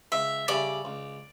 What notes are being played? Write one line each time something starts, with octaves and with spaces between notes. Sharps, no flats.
C#2 E5
C#3 G3 C#4 E4 D5
C#2